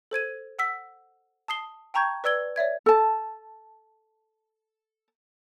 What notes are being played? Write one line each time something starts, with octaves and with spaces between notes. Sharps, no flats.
A4 C5 G#6 D#7
F#5 E6 B6
A5 D#6 C7 G7
G5 A5 A#5 C#6 G6 G#6
B4 D5 E6 G#6 G7
C#5 D5 E5 G#6
A4 A5